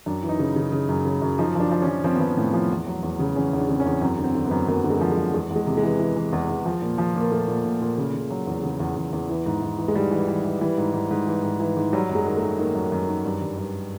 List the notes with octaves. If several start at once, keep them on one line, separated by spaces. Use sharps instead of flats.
F#2 D4
E3
D#4
C#3
C#3
C#3
F#2
C#3
F#2
F3 D#4
F3 D4
F3
C#4
F3
F3 C4
F3 B3
C4
A2
F3
E2
F#3
E2
C#3
E2 C#4
E2
D4
C#3 C4
C#4
E2
F#2 C4
D3
C4
D3
B3
F#2
F#2 A#3
D3
G#3
F3
G#3
F#2
E2 G#3
E2 G#3
C3
G#3
E3
E3
E3
E2
E2
F3
A#2
F3
A#2
A#3
A#2 A3
A#2
A#2
A#2
C#3
C#3
F#3
E2
C#3
E2
E2
E2
E3
G#2
G#2
E3
G#3
G#2 G3
E3
E3
E3
E3 G3
G#2
G#2
G#2
E3
G#2
E3
G#2
F#3 G3
F#2
G#3
D#3
A3
D#3
D#3 A#3
F#2
F#2
D#3
G2
G2
G2